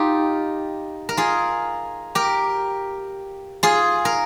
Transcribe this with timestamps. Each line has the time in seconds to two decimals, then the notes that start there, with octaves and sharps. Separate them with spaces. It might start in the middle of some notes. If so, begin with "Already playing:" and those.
Already playing: D#4 F4 G4
1.09 A#4
1.17 F4 G#4
2.15 G4 A#4
3.63 F4 G#4
4.05 A#4